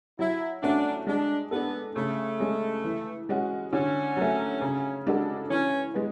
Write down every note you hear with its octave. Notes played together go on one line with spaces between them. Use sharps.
F#3 E4
A3 C#4 D4 F#4
G#3 D4
B3 D4 A4
C#3 A3
G#3 C#4
E3
G#3 C#4 F#4
D3 C#4
F#3 A3
C#3
G#3 D4 F#4 A4
E3 C#4
G#3 B3